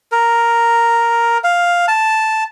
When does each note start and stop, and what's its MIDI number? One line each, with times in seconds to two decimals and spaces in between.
0.12 1.38 70
1.44 1.86 77
1.88 2.44 81